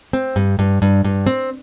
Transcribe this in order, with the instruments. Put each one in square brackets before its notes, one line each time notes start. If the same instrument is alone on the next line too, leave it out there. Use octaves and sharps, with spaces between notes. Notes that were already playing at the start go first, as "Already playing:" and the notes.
[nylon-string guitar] C4
G2
G2
G2
G2
C4